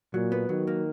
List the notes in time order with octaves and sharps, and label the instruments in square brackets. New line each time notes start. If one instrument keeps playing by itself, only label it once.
[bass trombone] A#2 [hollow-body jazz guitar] F#3
[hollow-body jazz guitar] B3
[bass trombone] D#3 [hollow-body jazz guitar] F#3
[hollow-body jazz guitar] A#3